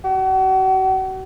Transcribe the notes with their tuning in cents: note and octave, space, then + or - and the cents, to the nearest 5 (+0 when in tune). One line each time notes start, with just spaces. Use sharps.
F#4 +40